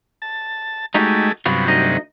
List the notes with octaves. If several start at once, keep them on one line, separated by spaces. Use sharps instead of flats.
A5
G#3 A3 D#4 F#4 G4
G2 C3 F#3 B3 F4 F#4
D2 D#4 D#5